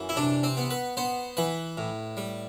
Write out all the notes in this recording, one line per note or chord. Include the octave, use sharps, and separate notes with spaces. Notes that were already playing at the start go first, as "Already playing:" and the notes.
Already playing: F#2 E3
E4
C3 D4
C4
B3
B4
B3 C5
E3 B4
A2
G3